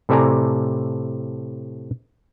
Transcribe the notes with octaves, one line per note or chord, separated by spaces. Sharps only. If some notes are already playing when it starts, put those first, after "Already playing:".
A2 C3 A4 D5 G#5 A#5